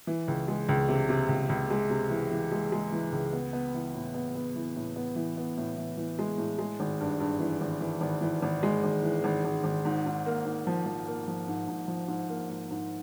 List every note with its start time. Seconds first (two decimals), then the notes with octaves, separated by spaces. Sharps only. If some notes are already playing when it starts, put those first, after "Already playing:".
0.07 E3
0.28 C#2
0.48 G#3
0.69 C#2
0.89 C3
1.09 C3
1.29 C#2
1.49 C#2
1.70 G#3
1.90 C3
2.10 E3
2.31 E3
2.52 G#3
2.72 G#3
2.92 E3
3.12 C#2
3.33 B3
3.53 B3
3.74 E3
3.95 A2
4.14 B3
4.35 B3
4.56 E3
4.76 A2
4.96 B3
5.16 E3
5.37 B3
5.57 A2
5.77 E3
5.97 E3
6.19 G#3
6.38 A2
6.59 G#3
6.80 G#1
7.00 G2
7.20 G2
7.40 E3
7.61 G#1
7.81 E3
8.01 G#1
8.21 E3
8.42 G#1
8.63 G#3
8.83 G#1
9.03 E3
9.24 G#1
9.44 G#1
9.64 G#1
9.85 G#2
10.06 G#2
10.26 A#3
10.45 G#2
10.67 F3
10.86 F3
11.07 A#3
11.28 F3
11.48 G#2
11.68 G#2
11.88 F3
12.08 G#2
12.29 A#3
12.50 G#2
12.70 G#2